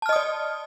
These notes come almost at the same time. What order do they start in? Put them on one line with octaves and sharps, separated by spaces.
A5 F6 D#5 D#6 D5